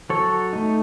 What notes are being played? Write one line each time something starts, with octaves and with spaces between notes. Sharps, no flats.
F#3 A4 C#5
A3 D#4